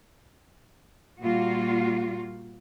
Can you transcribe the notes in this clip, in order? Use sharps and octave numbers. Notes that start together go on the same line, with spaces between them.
A#2 G3 A#3 F4 F#4